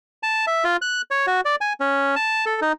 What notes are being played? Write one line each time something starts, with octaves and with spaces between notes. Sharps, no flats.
A5
E5
F4
F#6
C#5
F#4
D5
G#5
C#4
A5
A4
D#4